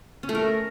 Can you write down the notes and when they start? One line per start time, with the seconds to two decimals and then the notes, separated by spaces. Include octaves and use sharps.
0.23 C#4
0.29 A3
0.35 A#4